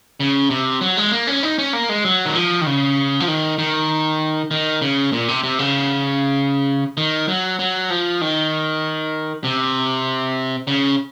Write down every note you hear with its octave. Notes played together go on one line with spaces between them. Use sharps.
C#3
C3
F#3
G#3
A#3
C#4
D#4
C#4
A#3
G#3
F#3
D#3
F3
D#3
C#3
F3
D#3
D#3
D#3
C#3
A#2
C3
C3
C#3
D#3
F#3
F#3
F3
D#3
C3
C#3